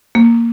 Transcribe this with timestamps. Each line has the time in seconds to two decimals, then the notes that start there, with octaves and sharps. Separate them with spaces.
0.15 A#3